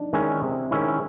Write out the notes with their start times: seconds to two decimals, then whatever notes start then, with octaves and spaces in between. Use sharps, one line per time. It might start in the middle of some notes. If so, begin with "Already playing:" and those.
Already playing: D4 D#4
0.13 D#3 G#3 C#4 E4
0.42 C3
0.71 D#3 G#3 C#4 E4